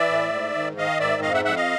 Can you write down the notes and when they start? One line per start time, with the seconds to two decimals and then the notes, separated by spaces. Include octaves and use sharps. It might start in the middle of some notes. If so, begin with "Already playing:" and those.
Already playing: E3 D5 E5
0.09 A2
0.33 G#2
0.55 D#3
0.77 D#3 D#5 F5
1.00 G#2 D5 E5
1.22 F2 D#5 F5
1.34 E5 F#5
1.45 F2 E5 F#5
1.56 D#5 F5